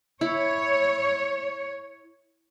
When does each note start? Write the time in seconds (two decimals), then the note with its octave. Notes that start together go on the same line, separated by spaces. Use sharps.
0.21 E4 C#5